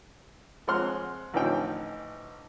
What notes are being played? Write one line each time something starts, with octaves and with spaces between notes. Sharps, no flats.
F3 G#3 C4 F#5 C6 F6
A1 D3 E3 F3 D#4 G5